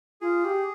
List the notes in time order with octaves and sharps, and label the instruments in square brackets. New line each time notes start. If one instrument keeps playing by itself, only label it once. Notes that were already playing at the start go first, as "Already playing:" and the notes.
[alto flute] F4 [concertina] G#4
[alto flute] G4